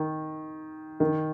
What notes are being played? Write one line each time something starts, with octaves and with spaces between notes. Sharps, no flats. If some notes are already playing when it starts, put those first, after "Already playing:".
Already playing: D#3
D#3